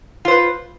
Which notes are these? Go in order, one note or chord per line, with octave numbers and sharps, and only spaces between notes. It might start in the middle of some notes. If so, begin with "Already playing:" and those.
F4 B4 C5